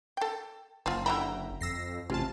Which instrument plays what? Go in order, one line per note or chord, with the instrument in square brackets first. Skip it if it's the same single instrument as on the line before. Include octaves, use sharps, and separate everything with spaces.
[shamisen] A4 G5
[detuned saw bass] F#1 [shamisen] F3 F4
[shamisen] D3 E3 B5 [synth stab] E5 G5 A#5
[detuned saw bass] F2 [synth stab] E6 A#6 C7
[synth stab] A1 F4 A5 [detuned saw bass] C3 [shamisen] G#3